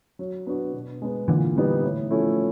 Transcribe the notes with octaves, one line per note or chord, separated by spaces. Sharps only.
F#3
B3 D4 F#4
B2
G#3 B3
A#2 D3 E3
G3 B3 D#4 G4
A2
F3 A3 C#4 E4